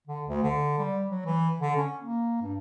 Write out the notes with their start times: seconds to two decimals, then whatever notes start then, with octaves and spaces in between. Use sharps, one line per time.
0.07 D3
0.27 D2
0.43 D3
0.78 G3
1.11 F#3
1.26 E3
1.60 D3
1.76 C#4
2.00 A#3
2.42 G2